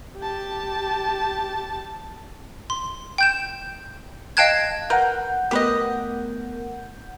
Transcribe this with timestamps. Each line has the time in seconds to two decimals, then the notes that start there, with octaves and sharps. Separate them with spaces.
0.18 G4 A5
2.70 C6
3.18 G5 G6 E7
4.37 D#5 F5 G5 A5 F#6 G#6
4.90 A#4 B4 F#5 G6
5.51 A3 B3 G4 A#4 B4 D#5